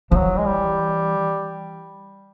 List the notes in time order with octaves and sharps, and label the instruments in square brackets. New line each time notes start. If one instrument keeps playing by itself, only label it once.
[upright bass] E3 [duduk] F3
[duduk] F#3
G#3
G3